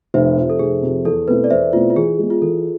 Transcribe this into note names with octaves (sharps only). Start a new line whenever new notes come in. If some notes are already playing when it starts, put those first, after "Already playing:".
F1 C5 E5
F2 C3
A4
F1 G#4
F2 C3
E2 A4
B2 A3 C4 E4 B4
D5
E2 C5 E5
B2 A3 C4 E4 F4
F4
E3 G#4
G#3 B3
F4
E3 A4